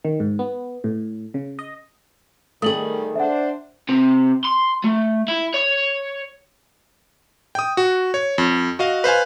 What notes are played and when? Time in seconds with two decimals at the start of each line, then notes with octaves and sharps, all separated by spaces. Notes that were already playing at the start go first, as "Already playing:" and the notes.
0.05 D#3
0.20 G#2
0.39 B3
0.84 A2
1.34 C#3
1.59 D#5
2.62 D#3 G3 A3 G#4 D#6 F#7
3.15 D4 C5 E5 F#5
3.89 C3
4.44 C6
4.84 A3
5.28 E4
5.54 C#5
7.55 G5 D#6
7.77 F#4
8.14 C#5
8.38 F2
8.79 F#4 D#5 F5
9.04 B4 C5 F5 G#5